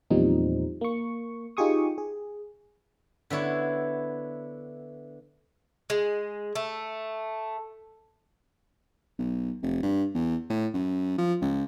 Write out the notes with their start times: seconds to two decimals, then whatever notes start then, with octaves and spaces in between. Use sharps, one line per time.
0.10 E2 A#2 F3 G3 C4 D#4
0.81 A#3 C#6
1.57 D#4 F4 G4 G#4 C#6 D#6
1.98 G#4
3.30 D3 B3 E4 C#5
5.90 G#3
6.55 A3
9.18 B1
9.62 F1
9.83 G2
10.14 E2
10.50 A2
10.74 F#2
11.18 F3
11.41 C#2